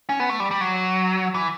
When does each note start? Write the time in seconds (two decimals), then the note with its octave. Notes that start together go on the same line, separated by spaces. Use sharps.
0.09 C#4
0.20 B3
0.30 A3
0.40 G3
0.51 G3
0.61 F#3
1.34 E3